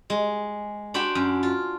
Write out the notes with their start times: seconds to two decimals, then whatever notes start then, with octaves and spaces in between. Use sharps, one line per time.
0.10 G#3
0.94 D4 F#4 C5 G5 B5
1.15 F#2
1.43 F4